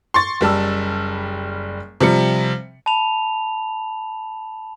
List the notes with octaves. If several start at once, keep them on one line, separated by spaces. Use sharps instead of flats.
C6 C#6 A6
F#1 G3 A5 E6
C3 F3 G3 C#7
A5 B5 F7